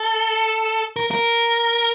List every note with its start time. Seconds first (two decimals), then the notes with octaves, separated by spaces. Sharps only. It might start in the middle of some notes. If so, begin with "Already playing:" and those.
Already playing: A4
0.96 A#4
1.11 A#4